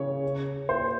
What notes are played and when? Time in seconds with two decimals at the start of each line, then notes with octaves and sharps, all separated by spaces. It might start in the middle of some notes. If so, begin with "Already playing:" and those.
Already playing: C#3 C#5
0.68 A#2 C5